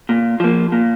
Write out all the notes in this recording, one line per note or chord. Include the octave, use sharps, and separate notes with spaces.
A#2
F3 A#3
A#2